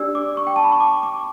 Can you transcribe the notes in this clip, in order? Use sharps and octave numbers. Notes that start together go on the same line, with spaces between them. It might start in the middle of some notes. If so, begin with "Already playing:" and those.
Already playing: D4 G4 D5 E6
D6
C#6
G5
A5
B5
C#6
D6
D6